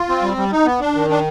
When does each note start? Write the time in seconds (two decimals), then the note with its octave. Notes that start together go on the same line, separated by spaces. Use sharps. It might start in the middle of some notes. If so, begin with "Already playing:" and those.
Already playing: F4
0.09 C4
0.22 G3
0.37 G3
0.52 D#4
0.66 B3
0.80 D4
0.95 D#3
1.10 D4